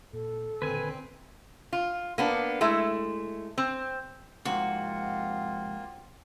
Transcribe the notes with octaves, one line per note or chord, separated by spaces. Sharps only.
A#2 A4
A#2 D3 D#3 C4 B4 G#5
F4
A#3 B3 D4
G#3 A3 E4
C4
F2 G#2 C3 A#3 C4 F4 F#4